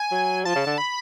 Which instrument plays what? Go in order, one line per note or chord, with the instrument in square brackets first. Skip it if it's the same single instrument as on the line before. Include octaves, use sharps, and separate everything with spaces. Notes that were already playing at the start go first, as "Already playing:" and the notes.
Already playing: [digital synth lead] G#5
[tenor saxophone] F#3
[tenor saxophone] F3 [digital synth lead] A5
[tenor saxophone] C#3
D3
[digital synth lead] B5